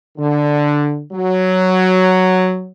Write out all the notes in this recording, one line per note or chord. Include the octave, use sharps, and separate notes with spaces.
D3
F#3